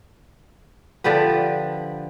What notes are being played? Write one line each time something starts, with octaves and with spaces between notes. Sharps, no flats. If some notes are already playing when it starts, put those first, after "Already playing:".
D3 F3 G4 B4